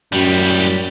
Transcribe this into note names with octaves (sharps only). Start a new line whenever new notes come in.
F#2 A2 G3